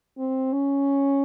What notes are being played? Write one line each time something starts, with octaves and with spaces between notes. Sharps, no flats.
C4
C#4